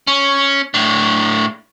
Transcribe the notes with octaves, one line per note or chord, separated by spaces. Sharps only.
C#4
A2 D4